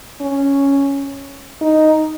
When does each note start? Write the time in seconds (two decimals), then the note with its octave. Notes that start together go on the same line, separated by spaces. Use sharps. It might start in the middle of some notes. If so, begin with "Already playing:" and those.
0.21 C#4
1.61 D#4